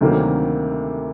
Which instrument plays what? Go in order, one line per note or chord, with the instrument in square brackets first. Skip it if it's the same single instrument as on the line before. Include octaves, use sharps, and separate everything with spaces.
[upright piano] D2 C3 D#3 F#3 A#3